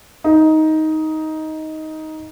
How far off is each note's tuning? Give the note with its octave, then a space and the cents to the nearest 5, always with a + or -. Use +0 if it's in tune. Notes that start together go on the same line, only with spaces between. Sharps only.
D#4 +10